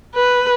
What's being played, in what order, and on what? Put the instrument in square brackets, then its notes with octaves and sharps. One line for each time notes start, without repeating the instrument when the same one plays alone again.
[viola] B4